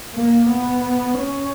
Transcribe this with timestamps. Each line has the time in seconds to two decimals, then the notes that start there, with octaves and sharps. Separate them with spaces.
0.14 A#3
0.49 B3
1.20 C#4